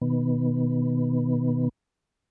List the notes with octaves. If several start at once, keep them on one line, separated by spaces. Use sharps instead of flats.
B2 D#3 B3